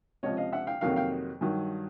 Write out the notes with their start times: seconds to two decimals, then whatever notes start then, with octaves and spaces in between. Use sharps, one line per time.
0.23 C#2 C3 F3 C#5 D#5
0.37 D#5 F5
0.52 E5 F#5
0.67 F5 G5
0.81 F2 C3 D#3 F#3 A#3 F5 G5
0.96 F5 G5
1.41 G2 D#3 F#3